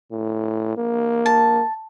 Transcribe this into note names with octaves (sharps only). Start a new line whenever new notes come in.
A2
A#3
A5